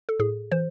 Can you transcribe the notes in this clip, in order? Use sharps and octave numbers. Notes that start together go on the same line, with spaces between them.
A4
A2 G#4
E3 C5